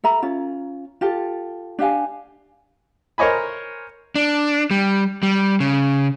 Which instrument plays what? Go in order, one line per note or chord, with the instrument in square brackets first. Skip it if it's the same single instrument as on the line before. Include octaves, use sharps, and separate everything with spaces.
[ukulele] A4 E5 A#5 B5
C#4 F4
F4 G4 A4
D4 G4 F5 G#5
[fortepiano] A#4 C5 C#5 D#5 G#5 B5
[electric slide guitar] D4
G3
G3
C#3